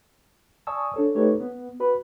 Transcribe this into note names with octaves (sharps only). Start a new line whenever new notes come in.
D5 G#5 A5 C#6 D#6 E6
D4 A4 C#5
A3 D#4 G4 A4 B4 C#5
B3
F#4 B4 B5